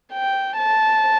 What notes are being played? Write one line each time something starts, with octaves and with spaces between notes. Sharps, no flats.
G5
A5